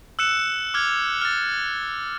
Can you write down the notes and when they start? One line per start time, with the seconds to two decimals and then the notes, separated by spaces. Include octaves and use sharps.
0.19 E6 F#6 C#7 E7
0.74 D6 F6 G#6
1.21 F6 A6